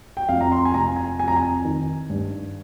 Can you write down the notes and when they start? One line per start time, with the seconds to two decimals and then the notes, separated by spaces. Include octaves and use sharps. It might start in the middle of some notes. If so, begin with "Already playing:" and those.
0.17 G5
0.29 F2 F5
0.41 A#5
0.52 C6
0.65 G#5
0.74 C3 A#5
0.96 G#5
1.19 F2 G#5
1.28 A#5
1.36 G#5
1.65 D#3
2.10 G2